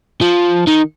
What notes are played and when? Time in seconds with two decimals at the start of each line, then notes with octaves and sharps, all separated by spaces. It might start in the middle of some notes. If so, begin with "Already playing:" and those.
0.21 F3
0.67 D#3